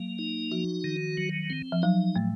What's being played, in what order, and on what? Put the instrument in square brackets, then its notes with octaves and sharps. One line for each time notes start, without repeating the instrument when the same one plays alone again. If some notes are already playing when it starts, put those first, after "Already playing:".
Already playing: [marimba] F#3 [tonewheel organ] A#3
[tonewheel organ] D#4
[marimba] F3 [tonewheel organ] F#4
[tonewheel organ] D#3
F#3
C4
[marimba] F3
[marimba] F#3 [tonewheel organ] D#4
[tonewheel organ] A2 [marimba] A3